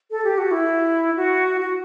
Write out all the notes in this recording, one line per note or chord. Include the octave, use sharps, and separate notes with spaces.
A4
G4
F#4
E4
F#4
F#4